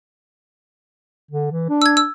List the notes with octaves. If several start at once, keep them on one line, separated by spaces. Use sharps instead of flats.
D3
E3
D4
E6 G#6
E6